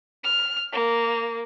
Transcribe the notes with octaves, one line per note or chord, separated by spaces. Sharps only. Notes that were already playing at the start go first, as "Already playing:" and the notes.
F6
A#3